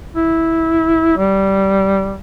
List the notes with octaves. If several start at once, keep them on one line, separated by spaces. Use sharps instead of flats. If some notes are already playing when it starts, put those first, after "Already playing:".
E4
G3